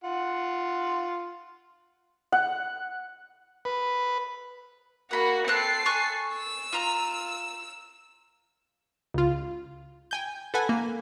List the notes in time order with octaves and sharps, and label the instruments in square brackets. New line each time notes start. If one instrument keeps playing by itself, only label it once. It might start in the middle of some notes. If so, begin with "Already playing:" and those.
[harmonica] F4 F#5
[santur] F#5
[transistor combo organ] B4
[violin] A#3 F#4 [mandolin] F#5 B5
[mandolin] C4 F#6 [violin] A4 C7
[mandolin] G#5 C#6 F#6
[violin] E6
[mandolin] F4 A#5
[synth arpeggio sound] C#2 F4
G5 G#5 G6
A4 B4 F#5 G#5
A#3